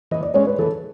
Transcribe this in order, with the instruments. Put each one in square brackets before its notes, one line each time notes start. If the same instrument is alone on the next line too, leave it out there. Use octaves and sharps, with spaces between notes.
[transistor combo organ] E3 [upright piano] D#5
[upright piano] D5
[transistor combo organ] G#3 C#4 [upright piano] C#5
[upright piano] B4
[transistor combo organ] E3 [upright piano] A4